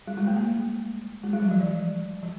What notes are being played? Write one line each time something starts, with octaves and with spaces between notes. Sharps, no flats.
G3
G#3
A3
A#3
G#3
G3
F#3
F3
E3
F3